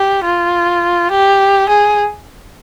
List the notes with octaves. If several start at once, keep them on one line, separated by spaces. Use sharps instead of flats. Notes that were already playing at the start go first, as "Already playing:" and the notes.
Already playing: G4
F4
G4
G#4